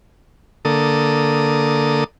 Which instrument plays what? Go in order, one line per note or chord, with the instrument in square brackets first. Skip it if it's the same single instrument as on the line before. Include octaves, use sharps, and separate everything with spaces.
[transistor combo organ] D3 A#3 A4 D#6